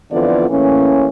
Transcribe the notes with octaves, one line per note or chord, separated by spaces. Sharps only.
F2 D3 E3 B3 F4 D5
A2 E3 A#3 C#4